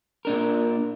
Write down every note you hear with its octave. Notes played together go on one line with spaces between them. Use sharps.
A#2 D4 A#4